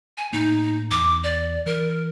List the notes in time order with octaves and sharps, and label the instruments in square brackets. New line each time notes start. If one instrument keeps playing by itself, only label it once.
[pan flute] G#5
[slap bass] A2 A#3 [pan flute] D#4
[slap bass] E2 [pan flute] D6
[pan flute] D5
[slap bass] E3 [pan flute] A#4